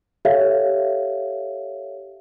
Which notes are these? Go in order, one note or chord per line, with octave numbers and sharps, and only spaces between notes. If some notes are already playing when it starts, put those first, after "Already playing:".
G4 A4 C#5 E5 F5